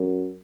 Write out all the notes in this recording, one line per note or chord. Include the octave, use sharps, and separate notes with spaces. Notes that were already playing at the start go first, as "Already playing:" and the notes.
Already playing: F#2